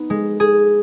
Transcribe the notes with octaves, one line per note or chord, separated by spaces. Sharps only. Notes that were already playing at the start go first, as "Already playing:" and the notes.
Already playing: B3 D#4
G#3
G#4